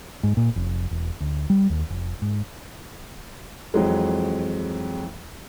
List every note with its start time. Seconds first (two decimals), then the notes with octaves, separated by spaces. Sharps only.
0.23 G#2
0.37 A#2
0.56 F1
0.91 E1
1.20 D2
1.50 G3
1.70 D#2
1.90 F1
2.22 G#2
3.74 F2 E3 F#3 G#3